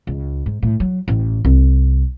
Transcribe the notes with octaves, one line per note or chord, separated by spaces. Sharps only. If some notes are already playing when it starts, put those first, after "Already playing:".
C#2
G#2
A2
F#3
A1
C2